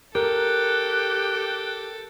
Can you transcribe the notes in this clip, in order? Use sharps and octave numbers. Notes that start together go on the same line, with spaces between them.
G4 A4 A#4 F#6